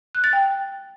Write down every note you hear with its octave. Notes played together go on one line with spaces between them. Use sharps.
F#6
A6
G5